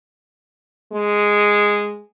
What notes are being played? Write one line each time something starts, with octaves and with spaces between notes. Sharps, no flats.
G#3